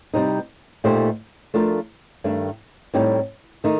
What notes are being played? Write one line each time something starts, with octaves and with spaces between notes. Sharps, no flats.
C3 G3 C4 D#4
A#2 A3 D#4 G4 C5
F3 A3 D4 F4 A#4
G2 D#3 A3 D4
A2 G3 C4 D#4 G4
D#3 A3 D#4